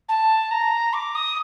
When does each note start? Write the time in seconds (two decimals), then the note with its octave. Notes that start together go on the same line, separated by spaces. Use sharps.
0.08 A5
0.50 A#5
0.93 D6
1.14 D#6